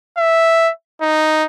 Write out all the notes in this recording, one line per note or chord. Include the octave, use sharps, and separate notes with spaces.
E5
D#4